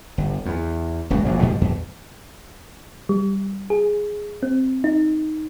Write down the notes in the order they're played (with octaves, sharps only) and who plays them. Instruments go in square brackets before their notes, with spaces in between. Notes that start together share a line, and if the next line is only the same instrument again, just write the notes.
[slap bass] G1
E2
D1 G1 C#2 F#2
F1 A#1 F2
G2 B2 F3 G3
E2
[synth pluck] G3
G#4
C4
D#4